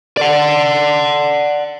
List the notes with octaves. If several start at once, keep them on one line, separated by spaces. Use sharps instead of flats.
D5 F#5